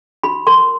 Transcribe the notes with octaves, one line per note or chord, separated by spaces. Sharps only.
F#4 B5
A#4 C6